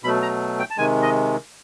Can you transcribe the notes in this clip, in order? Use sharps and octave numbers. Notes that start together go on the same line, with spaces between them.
B2 F#3 A3 B5
A#5
G5
A5
C3 D#3 G#3 G#5
D#5